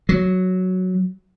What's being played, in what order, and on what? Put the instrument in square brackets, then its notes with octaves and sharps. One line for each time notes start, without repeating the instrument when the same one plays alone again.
[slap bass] F#3